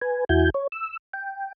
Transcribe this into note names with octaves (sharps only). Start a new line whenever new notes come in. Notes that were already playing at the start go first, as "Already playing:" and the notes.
B4 G#5
E2 E4 F#4 G#5 G6
C#5
E6
G5